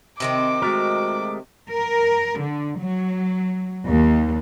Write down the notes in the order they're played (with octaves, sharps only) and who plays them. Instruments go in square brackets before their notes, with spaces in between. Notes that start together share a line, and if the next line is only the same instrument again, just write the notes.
[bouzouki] C3 D#3 C4 [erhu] D6
[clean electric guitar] G#3 A3 A#4 [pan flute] F#4
[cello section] A#4
D3
F#3
D#2